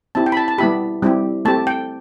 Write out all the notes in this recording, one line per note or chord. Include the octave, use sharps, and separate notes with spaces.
C4 E4 G4 A5
G5
B5
A5
A5
G3 B3 E4 G4 B5
G3 C4 E4 G4
A3 C4 G4 A5
G5